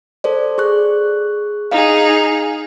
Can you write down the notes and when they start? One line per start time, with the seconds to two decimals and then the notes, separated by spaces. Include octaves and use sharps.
0.24 A4 C5 D5
0.58 G#4 C#6 F#6
1.71 D#4 G#4 F5